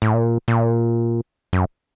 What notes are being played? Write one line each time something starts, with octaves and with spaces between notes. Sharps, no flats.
A2
A#2
A#2
F#2